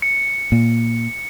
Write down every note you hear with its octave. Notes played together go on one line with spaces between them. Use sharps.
C#7
A#2